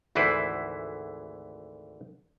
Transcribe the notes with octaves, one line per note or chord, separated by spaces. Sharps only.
G#1 D2 E3 E4 B4 C5